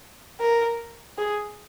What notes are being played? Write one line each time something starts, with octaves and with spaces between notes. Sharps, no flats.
A#4
G#4